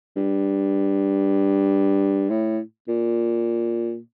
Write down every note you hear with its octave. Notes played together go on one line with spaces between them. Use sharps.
G2
A2
A#2